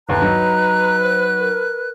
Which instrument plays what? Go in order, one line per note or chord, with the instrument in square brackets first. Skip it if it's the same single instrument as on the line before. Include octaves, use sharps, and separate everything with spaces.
[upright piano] G1 D#2 [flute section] B4 F#6 [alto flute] A#5
[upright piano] F#3 D#4
[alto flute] C5
A#4